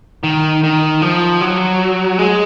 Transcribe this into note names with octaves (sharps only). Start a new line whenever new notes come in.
D#3
D#3
F3
F#3
G#3